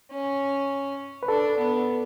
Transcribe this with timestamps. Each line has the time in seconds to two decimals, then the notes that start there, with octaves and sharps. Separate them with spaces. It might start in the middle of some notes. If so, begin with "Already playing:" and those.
0.11 C#4
1.23 B4
1.28 D4 A4
1.58 B3